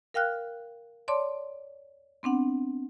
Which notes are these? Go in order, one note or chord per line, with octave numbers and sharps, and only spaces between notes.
A#4 F5 G5 F6 F#6
C#5 D5 A5 C6 D6
B3 C4 D4 F#5